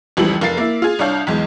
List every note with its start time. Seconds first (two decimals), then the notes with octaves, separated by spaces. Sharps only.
0.17 F1 C#2 E3 F3 G3 F#7
0.41 F1 A#4 F5 A6 C7
0.57 A#3 E4
0.82 F4 G#4
0.99 C2 D4 C#5 F5 G6
1.27 B1 E2 G#3